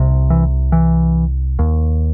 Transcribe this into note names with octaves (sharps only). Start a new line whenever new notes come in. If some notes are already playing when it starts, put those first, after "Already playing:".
Already playing: C2 C3
E3
E3
D#2